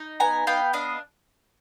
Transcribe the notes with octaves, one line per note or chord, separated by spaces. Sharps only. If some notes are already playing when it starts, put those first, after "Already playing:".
Already playing: D#4
B3 G#5 A#5
B3 F5 G5
D4 D#5 F5